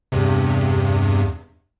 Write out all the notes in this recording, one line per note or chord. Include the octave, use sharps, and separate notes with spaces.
E2 G2 C3